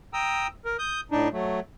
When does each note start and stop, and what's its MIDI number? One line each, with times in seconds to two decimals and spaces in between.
0.14 0.47 79
0.14 0.47 82
0.14 0.47 87
0.14 0.47 88
0.65 0.77 70
0.79 1.01 87
0.79 1.01 91
1.11 1.28 45
1.11 1.28 62
1.11 1.28 63
1.32 1.60 54
1.32 1.60 57